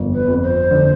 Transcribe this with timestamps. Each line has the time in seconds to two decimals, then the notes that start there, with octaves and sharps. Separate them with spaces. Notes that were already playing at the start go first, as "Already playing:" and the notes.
Already playing: G1 F2
0.13 B4
0.28 F2
0.43 C5
0.71 D3